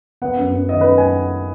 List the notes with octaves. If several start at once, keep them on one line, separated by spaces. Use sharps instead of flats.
B3 F#5
F#2
F#2
D#3 D#5
F#2 B4
G#5